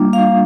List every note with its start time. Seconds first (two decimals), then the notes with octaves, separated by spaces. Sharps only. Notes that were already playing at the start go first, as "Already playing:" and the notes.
Already playing: G3 A#3 D4 F4
0.13 F5